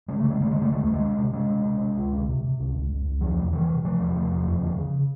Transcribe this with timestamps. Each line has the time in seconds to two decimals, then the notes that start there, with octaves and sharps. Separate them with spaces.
0.08 C#3 G#3
0.20 C#3 A3
0.30 G#3
0.40 C#3 A3
0.51 G#3
0.56 C#3
0.62 A3
0.71 D2 G#3
0.83 D2 A3
0.94 G#3
1.03 C3
1.18 C3
1.33 C3 G#3
1.50 C3
1.65 C3
1.81 C3
1.97 C#2
2.12 C3
2.28 C3
2.44 C3
2.59 C#2
2.75 C#2
2.91 C#2
3.05 C#2
3.21 E2 F3
3.38 C3
3.53 C3 E3
3.69 C3
3.84 C3 F3
3.99 E2
4.16 C3
4.31 E2
4.47 F2
4.63 C#3
4.77 C#3